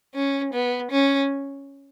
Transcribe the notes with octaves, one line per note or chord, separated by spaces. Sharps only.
C#4
B3
C#4